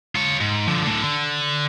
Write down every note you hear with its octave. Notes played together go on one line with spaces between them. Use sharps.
F4 C#5
G#2
D3 F3
A2 D3
D3